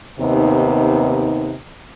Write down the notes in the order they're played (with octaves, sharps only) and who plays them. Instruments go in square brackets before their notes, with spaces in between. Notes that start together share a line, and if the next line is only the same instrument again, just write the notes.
[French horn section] D#2 C3 B3 D#4